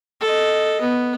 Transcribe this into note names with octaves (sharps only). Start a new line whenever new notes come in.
A4 D#5
B3